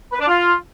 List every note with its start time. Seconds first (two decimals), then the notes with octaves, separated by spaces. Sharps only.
0.13 B4
0.20 D4
0.28 F4